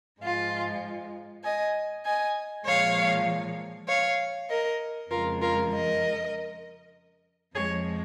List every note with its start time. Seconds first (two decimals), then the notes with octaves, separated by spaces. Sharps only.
0.21 G#2 F3 G#3 F4
1.43 D#5 G#5
2.04 D#5 G#5
2.65 A#2 F3 G#3 C#5 F5
3.88 C#5 F5
4.49 A#4 D#5
5.10 F2 C#3 F3 G#3 F4 A#4
5.41 F4 A#4
5.72 A#4 D#5
7.55 F2 F3 G#3 G#4 C#5